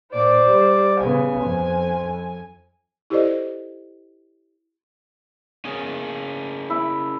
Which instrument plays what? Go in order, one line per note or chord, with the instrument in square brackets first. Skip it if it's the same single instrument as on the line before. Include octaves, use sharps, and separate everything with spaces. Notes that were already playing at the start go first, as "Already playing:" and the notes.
[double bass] A#2 [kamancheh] C5 D5
[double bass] G3
[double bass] C#3 B3 [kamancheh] G#5
[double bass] F2
[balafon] E4 G4 A4 C5 D5 D#5
[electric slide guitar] C#4 G#4 A#4
[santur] E4